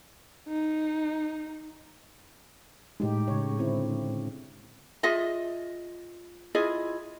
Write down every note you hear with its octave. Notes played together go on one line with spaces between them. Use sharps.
D#4
A2 G#3 D#4 G4
C#3 C#5
D3 C4 E4
F4 G#4 D#5 E5
E4 F4 G#4 D#5